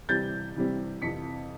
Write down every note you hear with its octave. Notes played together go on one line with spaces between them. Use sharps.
C3 E3 G3 C4 G6 A6
C3 E3 G3 C4
F2 C3 E3 B6 C#7